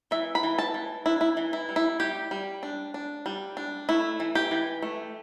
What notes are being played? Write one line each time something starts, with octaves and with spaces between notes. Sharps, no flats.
E3 E5
B5
E3
A5
E3
D4 E4
E4
E3
E4
G3
E4
G3 G4
G3
D4
D4
G3
D4
A3 E4
E3
G4
E3
A3